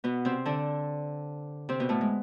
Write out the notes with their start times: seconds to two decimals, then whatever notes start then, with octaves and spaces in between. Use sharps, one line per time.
0.04 B2 B3
0.25 C3 C4
0.45 D3 D4
1.69 C3 C4
1.80 B2 B3
1.89 A2 A3
2.01 G#3